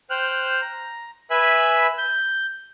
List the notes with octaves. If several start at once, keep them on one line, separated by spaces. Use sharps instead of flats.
C5 G5 F6 F#6
A#5
B4 E5 G#5 B5
G6